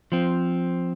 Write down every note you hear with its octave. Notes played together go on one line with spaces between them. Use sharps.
F3 C4